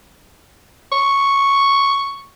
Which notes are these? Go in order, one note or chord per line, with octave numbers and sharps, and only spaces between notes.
C#6